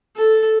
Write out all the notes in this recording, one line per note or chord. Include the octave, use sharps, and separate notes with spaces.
A4